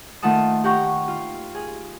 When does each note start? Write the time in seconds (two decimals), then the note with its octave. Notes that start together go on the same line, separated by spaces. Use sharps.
0.22 D#3 A3 F4 F#5 A5 D#6
0.64 G4 F#5 G5 A#5 C#6
1.08 F4
1.55 G#4